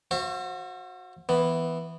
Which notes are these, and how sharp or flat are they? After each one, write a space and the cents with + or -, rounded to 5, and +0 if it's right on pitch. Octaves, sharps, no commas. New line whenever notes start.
F#4 -20 C5 +30 E5 +45
E3 +0 B3 +5